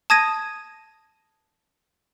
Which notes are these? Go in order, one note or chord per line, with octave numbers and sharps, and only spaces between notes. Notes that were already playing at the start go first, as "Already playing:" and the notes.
A5 D#6 G#6 A#6 D#7